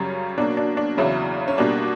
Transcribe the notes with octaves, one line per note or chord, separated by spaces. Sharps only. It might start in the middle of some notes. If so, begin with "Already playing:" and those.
Already playing: F#2 C#3 G3 C#4
B2 F#3 A#3 D4
D4
D4
E2 C#3 F#3 E4
C#4
B2 G3 A#3 D4